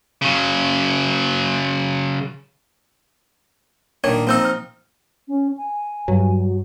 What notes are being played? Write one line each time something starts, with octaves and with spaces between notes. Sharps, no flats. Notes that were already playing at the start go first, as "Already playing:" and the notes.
C#3 F#3
A#2 D#3 D4 C#5
F3 A#3 C4 D#4 C5 E6
F6
C#4
G#5
G2 F#3